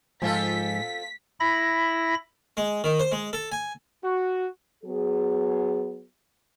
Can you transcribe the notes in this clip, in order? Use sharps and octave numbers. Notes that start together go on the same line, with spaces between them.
G#2 F3 C4 F4 A4 B6
E4 B5 A#6
G#3
D#3
C5
G#3
A4
G#5
F#4
F#3 B3 G#4